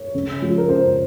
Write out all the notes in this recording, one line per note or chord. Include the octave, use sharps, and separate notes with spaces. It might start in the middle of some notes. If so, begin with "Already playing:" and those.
Already playing: C#5
C#3
F3 G#3
A#4
C#3 C5